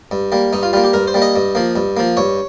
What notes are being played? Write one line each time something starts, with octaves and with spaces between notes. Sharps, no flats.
G2
G3 A#3
G2 D#4
F4
G3 A#3 F4
G4
G2 A#4
C5
G3 A#3
D#5
G2
F3 A#3
G2
F3 A#3
G2 C#5